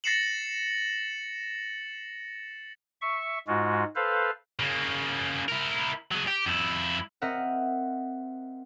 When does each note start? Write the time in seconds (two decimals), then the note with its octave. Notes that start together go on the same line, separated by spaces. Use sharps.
0.04 A6 A#6 C7 C#7 E7 F#7
3.01 E5 C#6
3.47 G#2 G#3 F4 F#4
3.96 A4 B4 C5 F5
4.60 C#3 A#3
5.48 E4 A#4
6.12 F#3 G#4
6.28 G4
6.46 F2 E4
7.22 C4 A#4 D#5 E5 F#5